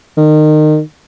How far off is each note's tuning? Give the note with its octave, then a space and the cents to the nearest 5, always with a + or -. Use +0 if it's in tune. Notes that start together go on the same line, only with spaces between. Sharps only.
D#3 -25